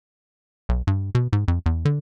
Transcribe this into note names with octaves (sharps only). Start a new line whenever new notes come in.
B1
G2
B2
G#2
F2
E2
D3